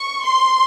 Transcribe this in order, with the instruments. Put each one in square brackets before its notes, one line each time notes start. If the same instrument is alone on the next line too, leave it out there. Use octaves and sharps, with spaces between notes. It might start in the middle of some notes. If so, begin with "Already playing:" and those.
Already playing: [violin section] C#6
C6